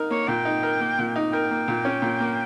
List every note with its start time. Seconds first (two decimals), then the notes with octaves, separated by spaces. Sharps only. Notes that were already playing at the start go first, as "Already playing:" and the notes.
Already playing: D#4 A#4
0.11 A#3 C#5
0.28 A#2 G5
0.45 D#4
0.63 A#4
0.80 A#3
0.99 A#2
1.16 D#4
1.33 A#4 G5
1.51 A#3
1.68 A#2
1.85 C#4
2.02 A#2
2.20 A#3